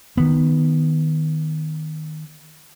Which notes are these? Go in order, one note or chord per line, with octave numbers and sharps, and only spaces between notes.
D#3 B3